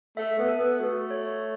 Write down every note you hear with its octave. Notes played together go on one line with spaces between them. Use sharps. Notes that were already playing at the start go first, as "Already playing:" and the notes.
A3 E5
B3
A4
B3
A3 F#4
C#5